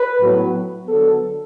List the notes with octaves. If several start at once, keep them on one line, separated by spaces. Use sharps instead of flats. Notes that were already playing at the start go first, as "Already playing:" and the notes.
Already playing: B4
A2 F#3 B3
D3 F#3 B3 A4